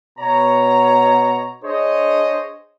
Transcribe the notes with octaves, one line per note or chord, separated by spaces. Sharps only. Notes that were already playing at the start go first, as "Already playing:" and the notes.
B2 C#5 A#5
D4 G#4 C5 C#5 D#5